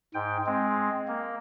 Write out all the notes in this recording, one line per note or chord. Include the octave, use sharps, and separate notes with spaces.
G#2 G5
G#3 C4
A#3